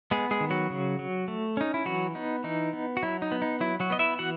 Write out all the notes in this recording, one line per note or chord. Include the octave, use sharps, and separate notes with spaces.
G#3 B3 G#4
G#3 G#4
D#3
F#3 F#4
C#3
F#3
A3
C#4 D#4
E4
E3 F#3 F#4
B3 D#4
E3 D#4
B3
F#4
F#3 E4
D#4
B3
D#4
F#3 E4
F#3 F#4
B3 D#5
E4 E5
E3 F#4 F#5